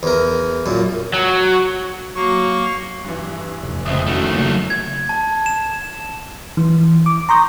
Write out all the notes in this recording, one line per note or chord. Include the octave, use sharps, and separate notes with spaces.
E2 A#4
F#2 A#2
F#3
F#3 A#3 C#6
G2 E3
F1
C#2 C4 E5 D#6
D#3 A3 C#4 E4 F#4
C#3 F#3 A#3
G#6
A5
E7
E3
D6
A#5 C6 C#6 D#6 G6 A#6